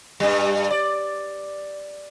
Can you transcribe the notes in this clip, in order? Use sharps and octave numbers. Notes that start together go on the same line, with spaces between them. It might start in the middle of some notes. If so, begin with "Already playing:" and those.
G2 G3
D5